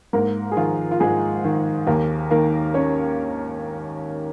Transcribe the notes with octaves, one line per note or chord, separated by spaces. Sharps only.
G#2 A#3 A#4
G#4
D#3 F3 F4
F4
G#2 G#3 G#4
D#3
D#2 A#3 A#4
D#3 A#3 A#4
C#4 C#5